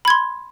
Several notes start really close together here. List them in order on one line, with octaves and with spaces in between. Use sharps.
B5 G#6 C6